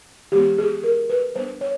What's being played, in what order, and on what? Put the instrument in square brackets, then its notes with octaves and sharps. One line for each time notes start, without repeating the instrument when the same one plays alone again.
[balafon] E3 G#3 B3 G4
G#4
A#4
B4
G3 B3 D4 C5
C#5